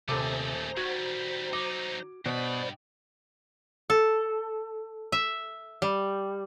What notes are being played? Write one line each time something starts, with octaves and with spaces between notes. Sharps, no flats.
D#1 C3 A3 G#4 A4 C5 A#5 D6
D#3 G3 F#4 G#6
F#3 D#4 D6
G2 B2 C5 D5 B5
A4
E5
G3